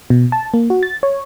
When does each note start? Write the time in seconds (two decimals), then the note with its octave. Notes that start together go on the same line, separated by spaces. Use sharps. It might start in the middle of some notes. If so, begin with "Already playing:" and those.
0.10 B2
0.32 A5
0.54 A#3
0.70 F#4
0.83 A6
1.03 C#5